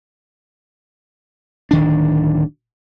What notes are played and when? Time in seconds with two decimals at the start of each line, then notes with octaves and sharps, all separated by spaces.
1.71 D1 D#3 D4